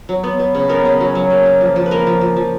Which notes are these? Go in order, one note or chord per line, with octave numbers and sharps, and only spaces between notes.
F#3
B3
B3
C#3
B3 A#4
C#3
F#3
F#3
A#3
A#3
F3
F3
B4
A#3 A#4
F3
F3
F3